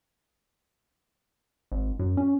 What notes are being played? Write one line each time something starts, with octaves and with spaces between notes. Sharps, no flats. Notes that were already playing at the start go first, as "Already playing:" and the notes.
G#1
F#2
C#4